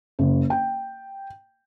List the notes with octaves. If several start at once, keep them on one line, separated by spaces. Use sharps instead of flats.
F#1
G5